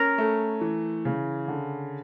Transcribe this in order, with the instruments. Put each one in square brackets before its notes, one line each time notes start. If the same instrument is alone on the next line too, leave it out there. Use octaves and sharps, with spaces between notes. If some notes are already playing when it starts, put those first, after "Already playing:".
Already playing: [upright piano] C#4 [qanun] A#4
[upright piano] A3
E3
C#3
D3